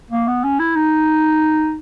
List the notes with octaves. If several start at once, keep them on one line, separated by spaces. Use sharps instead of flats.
A#3
B3
C#4
E4
D#4